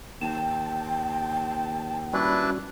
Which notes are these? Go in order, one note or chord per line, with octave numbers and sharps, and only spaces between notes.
D#2 G5 A5
G3 C#4 D4 E4 F#4 B4